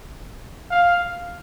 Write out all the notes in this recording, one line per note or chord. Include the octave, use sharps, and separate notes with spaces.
F5